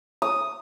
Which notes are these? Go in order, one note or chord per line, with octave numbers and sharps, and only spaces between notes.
D#6